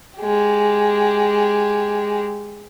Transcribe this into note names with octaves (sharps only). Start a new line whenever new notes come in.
G#3 G4